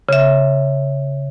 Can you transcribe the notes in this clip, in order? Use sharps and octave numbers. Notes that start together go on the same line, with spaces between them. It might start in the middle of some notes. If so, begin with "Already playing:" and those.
C#3 E5